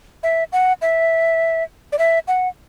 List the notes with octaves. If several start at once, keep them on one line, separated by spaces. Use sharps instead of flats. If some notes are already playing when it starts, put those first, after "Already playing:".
E5
F#5
E5
D5
E5
F#5